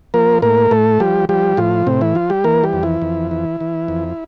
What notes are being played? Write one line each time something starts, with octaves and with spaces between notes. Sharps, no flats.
F3 A#3 A#4
A2 A#3 A#4
A2 A3 A4
F3 G3 G4
F3 G3 G4
A2 F3 F4
A2 C3 C4
E3 E4
F3 F4
G3 G4
E3 A#3 A#4
G3 G4
F2
E3 E4
F2
E3
E3
F2